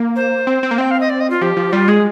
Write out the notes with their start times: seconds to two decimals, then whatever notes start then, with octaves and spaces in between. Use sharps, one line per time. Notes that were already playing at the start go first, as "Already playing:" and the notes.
Already playing: A#3
0.16 C5
0.47 C4
0.63 C4
0.71 A#3
0.78 C4 G5
0.91 F5
1.00 D#5
1.10 D5
1.20 D#5
1.30 F4
1.41 F3 G4
1.57 F3
1.72 G3 F4
1.88 G#3 G#4